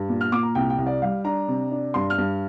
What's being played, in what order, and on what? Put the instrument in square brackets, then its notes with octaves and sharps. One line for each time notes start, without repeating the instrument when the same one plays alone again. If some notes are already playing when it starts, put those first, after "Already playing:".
Already playing: [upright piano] G2
A#2
F6
A#2 D6
A#5
C2 G5
G5
C2
D5
G3 F5
D4 A#5
C3
D4
G2 C6
F6
G2